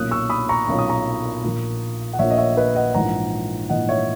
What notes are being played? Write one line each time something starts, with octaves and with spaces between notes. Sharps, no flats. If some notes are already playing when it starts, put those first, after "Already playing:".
Already playing: B1 A#2 A#3 C#4 D#6 F#6
C#6 E6
B5 D#6
A#5 C#6
B1 A#2 A#3 C#4 C#6
D#6
A#5 C#6
A#1 A#2 A#3
F#5
A#1 A#2 A#3 C#5 E5
D#5
C#5 E5
B4 D#5
D#5 F#5
A#1 G#2 E3 A#3 F#5 A#5
A#1 G#2 E3 A#3 D#5 F#5
C#5 E5